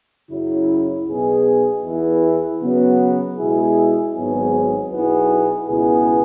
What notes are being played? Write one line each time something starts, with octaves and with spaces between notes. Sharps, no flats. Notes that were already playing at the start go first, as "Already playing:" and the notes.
F#2 C#3 F#3 E4
B1 B2 B3 G#4
E2 E3 B3 E4 G#4
C#3 F#3 B3 F#4
B2 G#3 E4 G#4
G#1 G#2 F#3 B3 G#4
B1 B2 B3 E4 G#4
C#2 B2 B3 E4 G#4